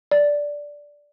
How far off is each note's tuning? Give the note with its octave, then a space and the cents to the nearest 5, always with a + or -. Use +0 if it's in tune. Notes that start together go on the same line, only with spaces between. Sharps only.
D5 -5